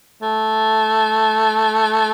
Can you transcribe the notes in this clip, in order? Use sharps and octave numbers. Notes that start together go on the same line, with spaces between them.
A3